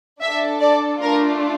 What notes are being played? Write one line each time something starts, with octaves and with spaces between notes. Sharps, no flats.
D4 A4 E5
D5
A3 D4 F4 A#4